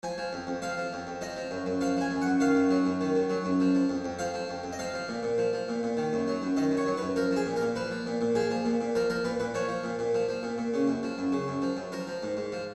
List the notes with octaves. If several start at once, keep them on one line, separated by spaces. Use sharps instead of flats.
F3 G#5
F3
F2
F2
F3 F5
F3
F2
F2
F3 D#5
F3
F#2
F#2
F3 F5
F3 G#5
F#2
F#5
F#2
D#3 F5
F#2
F#3
F#2
D#3
F#2
F#3
F#2
F3
F3
F2
F2
F3 F5
F3
F2
F2
D#5
F3 F5
F3
A#2
A#2
F3
F3
A#2
A#2
D#3
F#2
F#3
F#2
D#3 D#5
F#2
C#5
F#3
B4
F#2
F3 A#4
F3
G#4
A#2
A#4
A#2
F3 B4
F3
A#2
A#2
F3 G#4
F3
A#2
A#2
F3 A#4
F3 A#4
A#2 B4
A#2 B4
F3 C#5
F3
A#2
A#2
F3
F3
A#2
A#2
C#3
F#2
F3
F#2
C#3
F#2
F3
F#2
F3 A#4
F3
G#2
G#2
F3